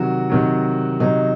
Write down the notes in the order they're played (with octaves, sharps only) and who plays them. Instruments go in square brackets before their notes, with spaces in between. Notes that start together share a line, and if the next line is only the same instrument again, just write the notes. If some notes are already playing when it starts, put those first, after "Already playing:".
Already playing: [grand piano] C3 D#3 F#3 F#4
C3 D#3 F#3
C3 D#3 F#3 D#4